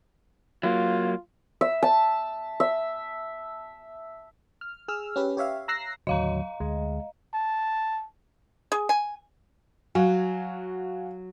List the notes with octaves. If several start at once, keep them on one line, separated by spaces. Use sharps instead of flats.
F#3 A#3 F4
E5
A5
E5
F6
G#4 E6 F6
C#4 G4 B4
G4 C#5 E5 F5
A#5 E6 F#6 A#6 C7
D#2 A2 D3 F#3 D#5 F5 A#5
D2 G#3
A5
G#4
G#5
F#3 F#4 F5 G#5